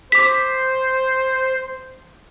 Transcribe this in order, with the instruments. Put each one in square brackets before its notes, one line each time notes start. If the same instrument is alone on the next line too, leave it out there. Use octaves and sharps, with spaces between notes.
[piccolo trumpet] C5 [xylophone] D6 B6